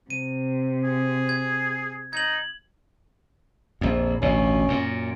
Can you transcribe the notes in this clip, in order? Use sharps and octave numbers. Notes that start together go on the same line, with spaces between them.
C3 D#7
G#4
G#6
D#4 G#6 F#7
A#1 F2
A1 D2 B2 C#4
F#2 A#2